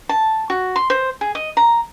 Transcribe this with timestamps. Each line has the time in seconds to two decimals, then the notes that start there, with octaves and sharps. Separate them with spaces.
0.09 A5
0.50 F#4
0.76 C6
0.90 C5
1.21 G#4
1.35 D#5
1.57 A#5